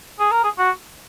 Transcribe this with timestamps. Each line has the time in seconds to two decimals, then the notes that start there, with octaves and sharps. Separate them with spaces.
0.19 G#4
0.32 A#4
0.44 G#4
0.59 F#4